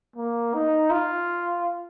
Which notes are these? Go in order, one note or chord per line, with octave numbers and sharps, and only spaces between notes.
A#3
D#4
F4